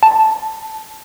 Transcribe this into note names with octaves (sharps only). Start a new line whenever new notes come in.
A5